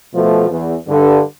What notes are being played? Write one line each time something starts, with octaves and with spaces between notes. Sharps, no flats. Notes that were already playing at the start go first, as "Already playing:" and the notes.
B2 F3 A3
E2
G2 D3